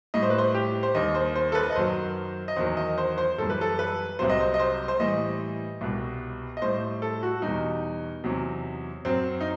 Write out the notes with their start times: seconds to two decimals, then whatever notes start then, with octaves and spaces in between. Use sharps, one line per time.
0.14 A2 G3 D#5
0.23 C5
0.30 B4
0.38 C5
0.54 G4
0.83 C5
0.95 D#2 D#3 G3 D#5
1.15 C5
1.36 C5
1.52 A4
1.55 B4
1.70 D#5
1.76 F#2 D#3 F#3 C5
2.48 D#5
2.56 E2 D#3 F#3 C5
2.77 D#5
2.98 C5
3.18 C5
3.38 F#2 E3 G3 A4
3.50 B4
3.61 A4
3.79 B4
4.19 C2 C3 F#3 C5
4.30 D#5
4.40 C5
4.54 D#5
4.60 C5
4.88 C5
4.99 A2 E3 G3 D#5
5.81 C2 B2 G3
6.57 D#5
6.62 A2 G3 C5
7.02 A4
7.23 F#4
7.42 E2 B2 G3 D#4
8.24 E2 C3 F#3
9.05 F#2 F#3 C4
9.40 D#4